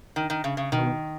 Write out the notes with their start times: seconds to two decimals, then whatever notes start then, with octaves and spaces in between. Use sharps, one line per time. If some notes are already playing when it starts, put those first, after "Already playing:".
0.16 D#3
0.30 D#3
0.44 C#3
0.57 C#3
0.72 B2 D#3